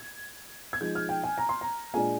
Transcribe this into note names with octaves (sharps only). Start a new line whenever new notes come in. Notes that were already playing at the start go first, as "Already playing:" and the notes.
Already playing: G#6
G#6
F3 G#3 D#4 G6
F6
G5
G#5
A#5
C6
A#5
A#2 G#3 D4 G#5